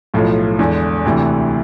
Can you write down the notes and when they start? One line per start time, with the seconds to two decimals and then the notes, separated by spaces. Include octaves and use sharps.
0.14 B1 A2 F3
0.59 E2 D3 G#3
1.05 D2 C3 E3